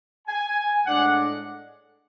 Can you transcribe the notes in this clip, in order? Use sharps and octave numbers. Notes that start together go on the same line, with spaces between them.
G#5
A2 G#3 D4 F#5